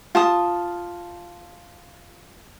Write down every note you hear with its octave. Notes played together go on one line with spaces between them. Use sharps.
F4 A5 D#6